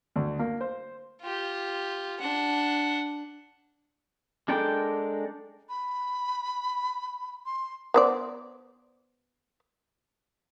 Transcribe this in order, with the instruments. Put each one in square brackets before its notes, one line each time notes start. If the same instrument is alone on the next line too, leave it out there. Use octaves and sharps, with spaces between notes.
[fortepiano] D2
A#3
C5
[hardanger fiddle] F4 G4
D4 F#5
[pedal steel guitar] G#3 D4 A4 A#4 G5
[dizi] B5
C6
[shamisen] B3 C5 D5